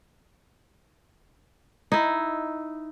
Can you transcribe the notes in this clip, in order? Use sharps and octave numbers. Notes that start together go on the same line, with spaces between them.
D#4 E4